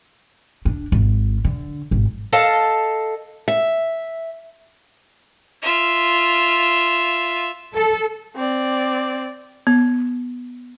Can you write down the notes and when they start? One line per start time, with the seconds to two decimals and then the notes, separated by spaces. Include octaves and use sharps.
0.65 D4
0.92 G#1
1.45 D3
1.91 G#1
2.33 A4 D#5 F5 A5
3.48 E5
5.62 F4 E5
7.74 A4
8.36 C4 D5
9.67 B3